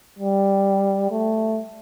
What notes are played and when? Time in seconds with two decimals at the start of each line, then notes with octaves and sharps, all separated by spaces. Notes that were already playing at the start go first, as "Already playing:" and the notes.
0.19 G3
1.11 A3